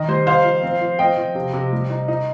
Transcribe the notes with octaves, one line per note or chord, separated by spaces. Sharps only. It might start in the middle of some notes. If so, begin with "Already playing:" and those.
Already playing: D#3 D#5
G3 C5
D#4 C5 F5
F3
C4
F3
C4 D#5 G5
F3
C3
C3
G3
D#4
D#4